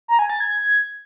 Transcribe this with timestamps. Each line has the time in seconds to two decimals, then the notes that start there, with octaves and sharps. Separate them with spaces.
0.08 A#5
0.19 G#5
0.30 A6
0.40 G#6